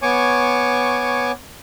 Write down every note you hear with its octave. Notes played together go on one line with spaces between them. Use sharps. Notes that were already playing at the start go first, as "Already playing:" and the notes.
B3 C#5 G#5 C#6 D6